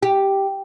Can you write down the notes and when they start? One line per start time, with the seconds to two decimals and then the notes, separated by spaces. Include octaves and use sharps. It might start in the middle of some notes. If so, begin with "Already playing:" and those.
0.03 G4